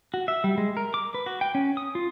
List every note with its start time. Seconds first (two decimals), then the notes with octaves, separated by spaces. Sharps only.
0.14 F#4
0.28 E5
0.44 G3
0.58 G#3
0.77 A#4
0.94 D6
1.14 B4
1.26 F#4
1.41 G5
1.55 C#4
1.77 D#6
1.95 F4